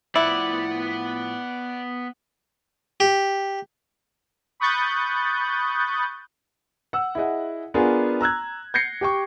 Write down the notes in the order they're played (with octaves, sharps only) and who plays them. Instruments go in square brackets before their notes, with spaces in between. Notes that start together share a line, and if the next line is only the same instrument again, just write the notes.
[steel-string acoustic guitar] A2 F3 [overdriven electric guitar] B3 F#5 [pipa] E4 [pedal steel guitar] D5
[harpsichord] G4
[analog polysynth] B5 C#6 D#6 F#6 G6 A6
[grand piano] F#5 E6
E4 G#4 D#5 F#5
B3 D4 F4 G#4 A#4
A#5 E6 F#6 G#6
G6 G#6 A#6 C7 C#7
G4 G5 C#6